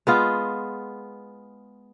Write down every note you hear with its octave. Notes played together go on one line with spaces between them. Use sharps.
G#3 B3 F4